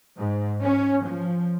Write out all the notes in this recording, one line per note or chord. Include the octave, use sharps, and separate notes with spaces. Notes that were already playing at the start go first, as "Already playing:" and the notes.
G#2
C#4
F3